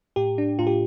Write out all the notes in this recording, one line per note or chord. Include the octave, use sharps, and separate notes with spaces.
A2 G4
D4
A2 F4
G4